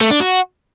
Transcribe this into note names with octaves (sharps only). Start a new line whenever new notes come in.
A3
D4
F#4